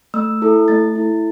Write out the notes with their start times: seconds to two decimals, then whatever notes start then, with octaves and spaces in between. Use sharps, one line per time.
0.14 A3 E6
0.42 E4 A4
0.68 A3 A6
0.96 E4 A4